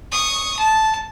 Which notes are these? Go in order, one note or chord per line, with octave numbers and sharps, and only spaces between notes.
C#6 D#6
A5